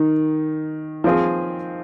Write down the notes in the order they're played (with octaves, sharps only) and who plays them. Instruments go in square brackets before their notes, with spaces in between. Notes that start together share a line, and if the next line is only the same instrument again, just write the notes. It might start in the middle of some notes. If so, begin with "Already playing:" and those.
Already playing: [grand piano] D#3 [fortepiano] D#4
[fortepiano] F3 C4 F4 G#4